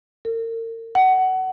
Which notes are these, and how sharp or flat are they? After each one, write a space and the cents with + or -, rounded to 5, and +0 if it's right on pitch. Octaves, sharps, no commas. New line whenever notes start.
A#4 -40
F#5 +20